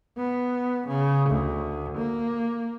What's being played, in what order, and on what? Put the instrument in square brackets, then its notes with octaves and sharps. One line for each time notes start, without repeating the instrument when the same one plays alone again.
[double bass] B3
C#3
D2
A#3